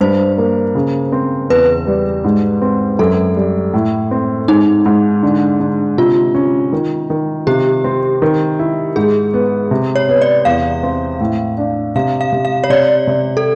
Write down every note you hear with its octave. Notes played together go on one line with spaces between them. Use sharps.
G2 C5
A#3
C#3
C4
E2 B4
G3
G#2
C4
F#2 A4
G3
A2
C4
G#2 D#4
G#2
D3
D3
C3 F4
C#4
D#3
D#3
C3 G4
C4
D#3
E4
G#2 G#4
B3
C3
C#5
B3
D5
E2 F5
C4
A2
D4
C3 F5
F5
C3
F5
C#5
C3 D5
C3
A4